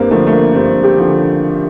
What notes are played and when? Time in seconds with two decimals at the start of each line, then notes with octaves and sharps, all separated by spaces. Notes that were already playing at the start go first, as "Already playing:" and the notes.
Already playing: G2 A#3 C4
0.11 D3 F3 A3
0.27 A3
0.32 A#3
0.54 G2 C4
0.83 G4
0.97 D3 F3